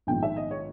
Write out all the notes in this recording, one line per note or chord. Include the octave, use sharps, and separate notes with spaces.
A#1 G#2 D#3 G5
E5
D#5
C#5